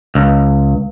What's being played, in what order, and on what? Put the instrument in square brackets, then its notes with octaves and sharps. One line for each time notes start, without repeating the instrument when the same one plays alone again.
[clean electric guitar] C#2